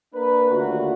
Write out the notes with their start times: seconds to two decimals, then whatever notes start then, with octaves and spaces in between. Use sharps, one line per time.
0.14 A#3 D4 A#4 B4
0.51 D#2 D3 A3 F4 F#4